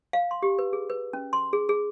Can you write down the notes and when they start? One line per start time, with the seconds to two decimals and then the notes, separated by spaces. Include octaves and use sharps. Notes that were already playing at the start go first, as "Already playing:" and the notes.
0.13 F5
0.31 C6
0.42 G4
0.59 B4
0.73 G#4
0.90 B4
1.13 C#4
1.33 C6
1.53 G#4
1.69 G#4